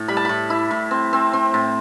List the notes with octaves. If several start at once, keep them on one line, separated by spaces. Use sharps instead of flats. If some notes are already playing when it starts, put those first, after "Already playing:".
Already playing: A2
G3 B5
A5
A2 B5
E4
A2
C4
C4
C4
A2